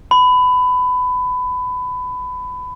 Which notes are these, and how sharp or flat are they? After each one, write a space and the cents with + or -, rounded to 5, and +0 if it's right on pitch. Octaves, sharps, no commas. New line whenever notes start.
B5 +20